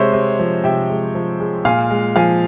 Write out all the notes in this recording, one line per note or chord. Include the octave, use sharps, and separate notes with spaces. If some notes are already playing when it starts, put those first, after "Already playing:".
Already playing: C3 G#3 C5 C#5 E5
C3
F3
C3 E5 G5
G#3
F3
G#3
A#2 F5 G#5
G#3
F3 F5 G#5